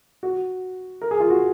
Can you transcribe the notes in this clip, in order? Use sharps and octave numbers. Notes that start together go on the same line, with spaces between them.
F#4
A#4
G#4
F4
F#4